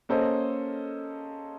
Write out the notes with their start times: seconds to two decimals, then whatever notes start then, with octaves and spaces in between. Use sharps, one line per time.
0.09 A#3 C#4 A4 C5 D#5